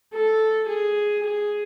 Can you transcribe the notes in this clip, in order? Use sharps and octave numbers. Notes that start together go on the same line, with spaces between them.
A4
G#4
G#4